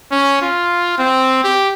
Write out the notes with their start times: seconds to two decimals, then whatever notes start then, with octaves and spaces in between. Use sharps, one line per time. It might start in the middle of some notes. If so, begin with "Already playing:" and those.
0.12 C#4
0.42 F4
0.98 C4
1.44 G4